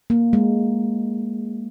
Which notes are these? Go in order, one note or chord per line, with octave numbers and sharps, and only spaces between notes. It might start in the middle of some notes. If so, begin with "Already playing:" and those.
A#3
G#3